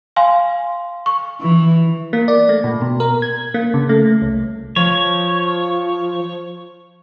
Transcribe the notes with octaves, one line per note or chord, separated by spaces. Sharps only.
F5 G#5 C6
C#6
E3
A#3
D5
A3
A#2
B2
A#4
G#6
A#3
C#3
A3
C2
F3 C#5